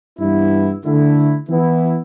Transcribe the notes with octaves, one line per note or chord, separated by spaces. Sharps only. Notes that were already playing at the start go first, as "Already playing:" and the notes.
G2 E3 B3 E4
D3 A3 E4
E3 B3 E4